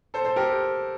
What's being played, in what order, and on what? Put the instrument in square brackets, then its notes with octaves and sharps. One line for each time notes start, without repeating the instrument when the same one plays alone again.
[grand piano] A4 C5
A4 C5
G4 A#4